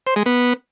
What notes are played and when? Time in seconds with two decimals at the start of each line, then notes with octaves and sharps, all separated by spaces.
0.07 C5
0.16 G#3
0.26 B3